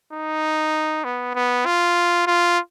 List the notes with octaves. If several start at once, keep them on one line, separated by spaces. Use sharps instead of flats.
D#4
B3
B3
F4
F4